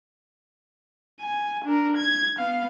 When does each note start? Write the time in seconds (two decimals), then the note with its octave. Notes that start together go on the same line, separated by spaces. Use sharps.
1.21 G#5
1.64 D4 A#4
1.96 G#6
2.38 B3 F5